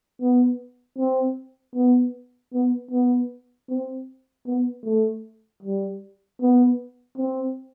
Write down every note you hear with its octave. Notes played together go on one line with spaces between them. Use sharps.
B3
C4
B3
B3
B3
C4
B3
A3
G3
B3
C4